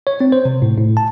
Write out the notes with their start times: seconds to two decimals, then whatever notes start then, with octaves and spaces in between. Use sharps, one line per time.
0.07 C#5
0.21 C4
0.32 C5
0.45 C3
0.62 A2
0.77 A2
0.97 A5